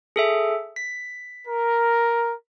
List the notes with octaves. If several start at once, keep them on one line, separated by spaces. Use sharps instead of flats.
G#4 A4 E5
B6
A#4